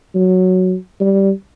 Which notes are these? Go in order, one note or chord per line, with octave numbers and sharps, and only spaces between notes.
F#3
G3